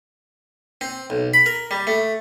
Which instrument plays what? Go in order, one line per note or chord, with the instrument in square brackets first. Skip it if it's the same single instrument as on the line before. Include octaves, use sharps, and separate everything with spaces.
[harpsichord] C4
B1
B5
A#4
G3
A3